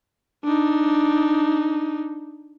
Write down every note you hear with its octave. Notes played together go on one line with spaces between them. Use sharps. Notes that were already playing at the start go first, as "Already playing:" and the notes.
D4 D#4